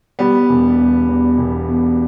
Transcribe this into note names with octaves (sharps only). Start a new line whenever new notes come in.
B2 G3 B3
E1
E2
E2
E1
B2